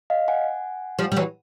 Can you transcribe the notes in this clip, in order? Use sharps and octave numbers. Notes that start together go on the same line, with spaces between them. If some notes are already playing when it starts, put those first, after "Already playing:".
D#5 F5
F#5 G#5
F3 G3
G3
E3 F#3